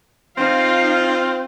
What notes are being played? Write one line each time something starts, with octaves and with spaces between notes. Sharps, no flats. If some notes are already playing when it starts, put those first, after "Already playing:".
C4 D#4 F4 F5